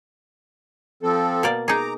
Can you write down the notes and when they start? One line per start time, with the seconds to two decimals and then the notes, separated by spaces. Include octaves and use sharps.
1.03 F3 C4 A4
1.43 B2 A#3 D5
1.68 D#4 G#4 A#5 D6